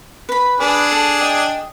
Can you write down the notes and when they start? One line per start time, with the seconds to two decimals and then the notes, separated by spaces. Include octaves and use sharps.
0.29 B4 B5
0.60 D4 G#4 B4
0.91 A4 D5
1.20 D#5 G5